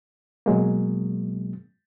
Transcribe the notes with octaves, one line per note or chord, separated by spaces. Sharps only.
B2 F#3 G#3 A#3